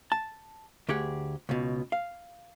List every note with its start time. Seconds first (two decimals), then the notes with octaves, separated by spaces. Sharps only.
0.12 A5
0.89 D2 G4 G#4 F#5
1.49 C#2 B2
1.92 F5